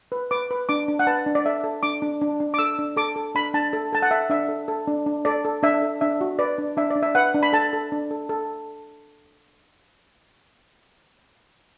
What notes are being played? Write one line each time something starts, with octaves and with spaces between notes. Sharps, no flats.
B4
B4 D6
B4
D4 D6
D4
F#5
B4 A5
D4
D5
A4 E5
A4
D4 D6
D4
D4
D4
D6
A4 E6
D4
A4 D6
A4
D4 B5
D4 A5
A4
A4 A5
F#5
A4 E5
D4 E5
A4
A4
D4
D4
A4 D5
A4
D4 E5
A4
D4 E5
F#4
B4 D5
D4
D4 E5
D5
D4
E5
B4 F#5
D4
B5
A4 A5
A4
D4
A4
A4